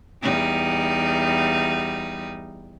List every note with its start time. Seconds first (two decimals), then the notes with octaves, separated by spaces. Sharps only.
0.22 E2 G3 D#4